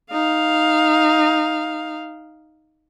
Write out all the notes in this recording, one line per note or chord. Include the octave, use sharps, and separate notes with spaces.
D#4 F5